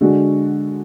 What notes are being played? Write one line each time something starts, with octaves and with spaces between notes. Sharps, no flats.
D3 G#3 D4 F#4